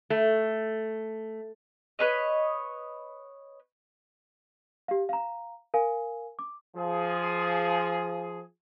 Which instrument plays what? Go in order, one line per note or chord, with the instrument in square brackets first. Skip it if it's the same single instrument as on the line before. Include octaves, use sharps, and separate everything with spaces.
[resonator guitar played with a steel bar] A3
[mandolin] B4 C#5 D#5
[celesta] G4 F5
F5 A#5
A#4 F5 G#5
D6
[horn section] F3 G#4